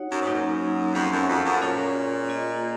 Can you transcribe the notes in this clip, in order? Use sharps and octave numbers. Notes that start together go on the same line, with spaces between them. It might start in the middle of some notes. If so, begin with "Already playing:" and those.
Already playing: D#4 F#4 C#5 F#5
F#2
G#2
F#3 A#3 D#4
F#2
F2 C#4 G#4 C5 F#5
F#2
F2
F#2
A#2 C#4 F4 G#4 C#5
A#3 F4 G#4 D#5